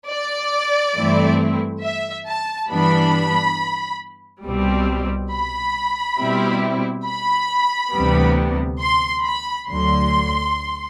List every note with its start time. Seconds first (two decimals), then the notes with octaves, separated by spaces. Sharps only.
0.08 D5
0.95 G2 E3 A3 C4 E4
1.83 E5
2.27 A5
2.70 G2 E3 G3 B3 D4 B5
4.45 C2 B2 G3 C4
5.32 B5
6.20 B2 G3 C4 E4
7.07 B5
7.94 D2 C3 E3 G3 B3
8.80 C6
9.25 B5
9.68 D2 D3 F#3 C6